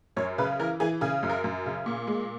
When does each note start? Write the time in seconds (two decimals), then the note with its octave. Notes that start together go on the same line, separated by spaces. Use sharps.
0.16 F#2 C#5
0.38 C#3 B4
0.59 E3 A#4
0.80 E3 G#4
1.01 C#3 G#4
1.23 F#2
1.29 A#4
1.44 F#2
1.66 C#3
1.86 A#2
2.07 G#3